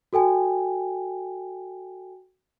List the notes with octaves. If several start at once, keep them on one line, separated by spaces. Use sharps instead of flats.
F#4 A4 G5 G#5